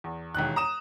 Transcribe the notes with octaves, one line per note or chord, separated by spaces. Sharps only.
E2
E1 D#2 F#6
A#5 D#6 E7